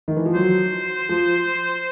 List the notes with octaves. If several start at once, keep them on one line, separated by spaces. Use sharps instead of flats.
D#3
E3
F3
F#3 C5
F3